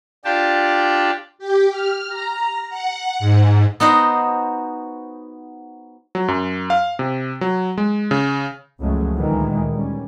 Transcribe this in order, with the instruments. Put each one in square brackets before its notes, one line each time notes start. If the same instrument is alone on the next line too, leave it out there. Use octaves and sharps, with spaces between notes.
[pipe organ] D4 F4 G4 D5 G5 A5
[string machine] G4
F6
A#5
F#5
G#2
[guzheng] B3 D#4 F#4 C5
[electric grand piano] F#3
F#2
F5
C3
F#3
G#3
C#3
[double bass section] C#2 F#2 F3 F#3 G#3 A3
D2 A#2 D#3 E3 G#3
G3 C#4